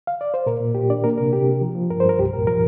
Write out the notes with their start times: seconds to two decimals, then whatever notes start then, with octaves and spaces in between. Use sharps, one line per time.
0.07 F5
0.21 D5
0.34 C5
0.46 A#2 A#4
0.60 A#2
0.75 A#2 G4
0.89 D4 D5
1.04 A#3 A#4
1.18 C3 A#4
1.33 C3 G4
1.46 C3
1.61 F3
1.75 F3
1.90 G2 A#4
2.00 C5
2.04 G2 A#4
2.18 C2 G4
2.33 A#2 A#4
2.47 F3 A#4